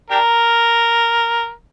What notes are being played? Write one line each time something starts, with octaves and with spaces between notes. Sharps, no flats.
D4 G4 A#4